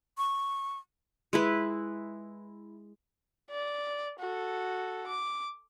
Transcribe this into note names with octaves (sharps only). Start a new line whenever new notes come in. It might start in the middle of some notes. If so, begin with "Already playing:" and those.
C#6
G#3 E4 B4
D5
F#4 A4
D6